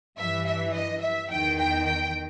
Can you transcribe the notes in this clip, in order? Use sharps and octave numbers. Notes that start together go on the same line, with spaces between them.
G2 E3 E5
E5
D#5
E5
E2 D#3 G5
G5
G5